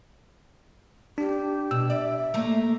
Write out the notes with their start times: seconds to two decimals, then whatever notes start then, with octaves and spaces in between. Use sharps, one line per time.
1.18 D4 G4
1.71 B2 E6
1.90 D5 E5
2.34 A3 A#3